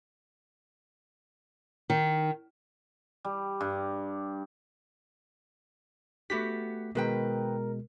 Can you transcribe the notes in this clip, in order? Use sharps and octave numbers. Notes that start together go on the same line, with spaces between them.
D#3
G3
G2
A3 B3 F#4 G4 B6
B2 D#3 G#3 A#4 B4 G5